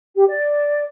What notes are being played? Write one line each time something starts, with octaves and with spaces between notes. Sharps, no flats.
G4
D5